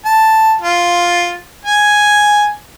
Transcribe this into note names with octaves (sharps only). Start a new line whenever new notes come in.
A5
F4
G#5